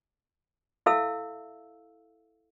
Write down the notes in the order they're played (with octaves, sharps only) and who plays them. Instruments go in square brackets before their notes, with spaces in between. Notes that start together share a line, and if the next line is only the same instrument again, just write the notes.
[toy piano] E4 A4 E5 F5 E6